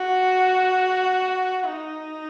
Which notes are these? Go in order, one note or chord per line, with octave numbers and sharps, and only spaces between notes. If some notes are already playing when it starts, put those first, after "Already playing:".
Already playing: F#4
D#4